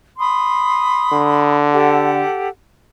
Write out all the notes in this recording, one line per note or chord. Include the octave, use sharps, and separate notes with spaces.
B5 C6 D#6
D3
G4 A4 F#5